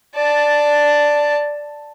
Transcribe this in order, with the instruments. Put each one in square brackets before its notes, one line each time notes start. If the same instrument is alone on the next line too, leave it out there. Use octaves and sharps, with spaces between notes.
[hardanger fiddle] D5 A5